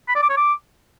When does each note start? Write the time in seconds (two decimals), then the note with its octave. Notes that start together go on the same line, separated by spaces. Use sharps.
0.08 B5
0.15 D5
0.23 D6
0.30 C#5
0.37 D6